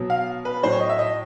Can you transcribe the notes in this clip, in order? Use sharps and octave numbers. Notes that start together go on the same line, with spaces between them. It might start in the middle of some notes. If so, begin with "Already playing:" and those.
Already playing: B2 F#3
F5
B4
A2 F#3 C5
C#5
D#5
E5
D#5